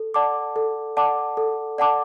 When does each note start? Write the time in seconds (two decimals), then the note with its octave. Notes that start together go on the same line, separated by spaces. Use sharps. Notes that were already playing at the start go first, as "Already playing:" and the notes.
Already playing: A4
0.14 D5 F#5 A5 D6
0.56 A4
0.97 D5 F#5 A5 D6
1.37 A4
1.78 D5 F#5 A5 D6